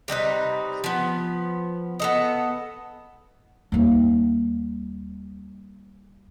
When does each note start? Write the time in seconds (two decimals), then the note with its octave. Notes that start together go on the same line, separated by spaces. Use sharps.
0.08 C3 G3 D#4 B4
0.84 F3 B3
1.99 B3 A4 D#5
3.72 D#2 G3